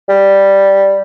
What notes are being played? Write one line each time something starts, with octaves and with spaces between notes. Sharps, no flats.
G3